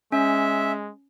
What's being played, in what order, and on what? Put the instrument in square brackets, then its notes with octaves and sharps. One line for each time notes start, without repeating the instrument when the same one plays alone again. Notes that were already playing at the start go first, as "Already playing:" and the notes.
[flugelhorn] G#3 [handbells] C#4 [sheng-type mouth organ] E5